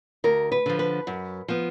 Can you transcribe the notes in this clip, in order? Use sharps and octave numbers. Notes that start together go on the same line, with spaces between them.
D2 A#4
B4
D3 F3
B4
F#2
F3 B3